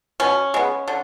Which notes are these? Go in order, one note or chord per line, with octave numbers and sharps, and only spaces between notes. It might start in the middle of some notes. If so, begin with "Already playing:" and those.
B2 C#4
G#3 B3
D3